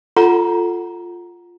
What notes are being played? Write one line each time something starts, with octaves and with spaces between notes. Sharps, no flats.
F4 A4 F#5 A#5